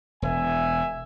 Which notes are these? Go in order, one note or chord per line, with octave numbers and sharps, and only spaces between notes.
E1 E5 G#5